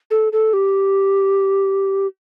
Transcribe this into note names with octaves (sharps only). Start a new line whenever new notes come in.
A4
A4
G4